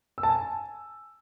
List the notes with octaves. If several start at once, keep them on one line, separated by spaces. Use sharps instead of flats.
E6
A5
G#5